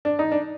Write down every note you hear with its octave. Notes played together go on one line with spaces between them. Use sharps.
D4
D#4
D4